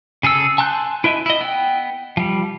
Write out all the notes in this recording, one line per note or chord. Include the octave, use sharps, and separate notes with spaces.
C#3 G#4 A4 E6
G#5 A5 C6 F#6 G6
E4 B4 D#5 E5
E4 D#5
B3 G5
F3 G3